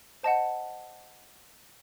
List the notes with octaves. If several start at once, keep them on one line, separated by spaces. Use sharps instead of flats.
C5 D#5 F#5 A5